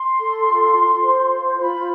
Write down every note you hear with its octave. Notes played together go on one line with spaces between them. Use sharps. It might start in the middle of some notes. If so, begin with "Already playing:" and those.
Already playing: C6
A4
F4
F4
C5
F4
F4 B5